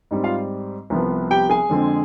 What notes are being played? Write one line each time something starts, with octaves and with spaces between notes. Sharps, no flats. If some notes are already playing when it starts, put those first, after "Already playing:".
G#2 G3 C4
F4 F5
C2 C3 F3 B3
G4 G5
G#4 G#5
F2 D3 G#3 C4